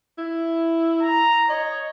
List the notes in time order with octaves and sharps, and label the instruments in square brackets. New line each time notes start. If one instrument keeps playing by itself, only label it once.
[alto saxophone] E4
[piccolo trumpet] A#5
[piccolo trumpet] C#5 [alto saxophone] D#5